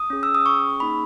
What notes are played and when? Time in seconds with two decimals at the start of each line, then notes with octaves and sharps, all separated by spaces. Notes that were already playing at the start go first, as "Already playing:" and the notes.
Already playing: D#6
0.10 C#4 G#4
0.23 E6
0.35 D#6
0.46 C#6
0.80 A#3 D#4 G#4 B5